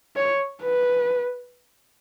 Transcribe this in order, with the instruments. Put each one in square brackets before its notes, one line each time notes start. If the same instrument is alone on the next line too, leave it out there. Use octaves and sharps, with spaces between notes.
[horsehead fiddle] C#5
B4